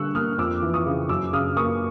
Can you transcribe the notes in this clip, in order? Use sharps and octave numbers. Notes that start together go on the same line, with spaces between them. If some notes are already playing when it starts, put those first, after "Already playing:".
Already playing: D3 G3 C#6 E6 F#6
A#3 D#6 F6
F2 D6 E6
E3
C#6 D#6
C#3
F#2 D6 E6
C#3 D#6 F6
A#3 C#6 D#6